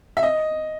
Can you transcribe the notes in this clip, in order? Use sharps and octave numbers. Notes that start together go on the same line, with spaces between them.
E5
D#5